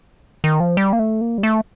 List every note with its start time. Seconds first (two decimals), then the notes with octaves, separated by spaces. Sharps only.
0.44 D#3
0.60 F3
0.77 G3
0.93 A#3
0.99 A3
1.21 A#3
1.38 G3
1.43 A3